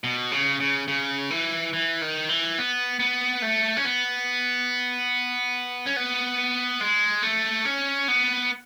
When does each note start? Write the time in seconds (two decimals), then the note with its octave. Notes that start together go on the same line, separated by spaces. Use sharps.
0.04 B2
0.32 C#3
0.60 C#3
0.88 C#3
1.31 E3
1.73 E3
2.01 D#3
2.29 E3
2.58 B3
3.00 B3
3.42 A3
3.77 C#4
3.85 B3
5.86 C#4
5.96 B3
6.81 G#3
7.23 A3
7.65 C#4
8.08 B3